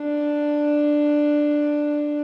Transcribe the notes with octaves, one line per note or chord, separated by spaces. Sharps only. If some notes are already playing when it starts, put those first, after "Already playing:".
Already playing: D4